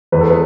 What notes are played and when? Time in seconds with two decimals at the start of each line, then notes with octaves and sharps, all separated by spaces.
0.12 E2 B4
0.21 A4
0.30 G#4 B4